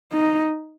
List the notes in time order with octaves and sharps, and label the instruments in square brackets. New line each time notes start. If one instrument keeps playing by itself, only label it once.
[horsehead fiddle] D#4